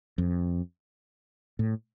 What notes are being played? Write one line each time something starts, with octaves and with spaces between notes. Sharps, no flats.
F2
A2